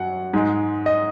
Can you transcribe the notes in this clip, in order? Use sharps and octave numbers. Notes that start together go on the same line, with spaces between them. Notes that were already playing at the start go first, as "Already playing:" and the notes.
Already playing: F#2 F#3 F#5
G#2 G#3
D#5